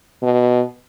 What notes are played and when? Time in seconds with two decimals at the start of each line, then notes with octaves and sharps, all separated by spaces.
0.23 B2